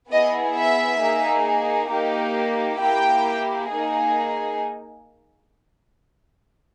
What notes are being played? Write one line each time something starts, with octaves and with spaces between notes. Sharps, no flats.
B3 E4 G#4 D#5
E5
A#3 D#4 G#4
A#3 D#4 G4
A#3 E4 G4 G5
A#3 D#4 G#4